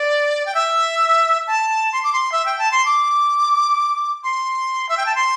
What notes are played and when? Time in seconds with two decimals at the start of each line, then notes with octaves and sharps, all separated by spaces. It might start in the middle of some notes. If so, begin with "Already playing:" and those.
Already playing: D5
0.46 G5
0.55 E5
1.47 A5
1.93 C6
2.04 D6
2.13 C6
2.32 E5
2.46 G5
2.59 A5
2.72 C6
2.86 D6
4.24 C6
4.89 E5
4.98 G5
5.06 A5
5.15 C6